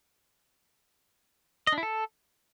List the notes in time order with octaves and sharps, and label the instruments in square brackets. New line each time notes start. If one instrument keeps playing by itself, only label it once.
[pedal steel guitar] D#5
D4
E4
A4